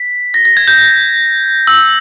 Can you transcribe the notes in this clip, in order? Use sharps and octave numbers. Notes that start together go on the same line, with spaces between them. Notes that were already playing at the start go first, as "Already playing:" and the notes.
Already playing: B6
A#6
A#6
G#6
G6
E6